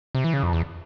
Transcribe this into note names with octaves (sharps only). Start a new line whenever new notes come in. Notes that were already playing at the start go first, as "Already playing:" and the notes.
C3
E3
C#3
F2
E2